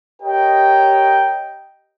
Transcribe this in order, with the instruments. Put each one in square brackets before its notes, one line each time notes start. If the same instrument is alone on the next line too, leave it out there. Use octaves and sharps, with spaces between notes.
[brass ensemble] G4 A#4 C#5 D#5 G5